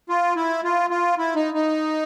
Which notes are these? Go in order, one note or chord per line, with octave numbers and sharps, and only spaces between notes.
F4
E4
F4
F4
E4
D#4
D#4